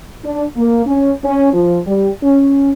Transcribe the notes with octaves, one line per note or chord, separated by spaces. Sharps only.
D4
A#3
C#4
C#4
F3
G3
C#4